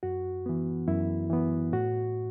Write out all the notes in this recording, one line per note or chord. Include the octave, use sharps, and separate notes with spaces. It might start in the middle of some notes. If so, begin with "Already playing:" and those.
F#2 F#4
E3 B3
F#2 E4
E3 B3
A2 F#4